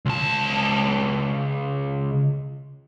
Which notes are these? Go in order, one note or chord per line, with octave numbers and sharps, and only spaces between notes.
C#2 A5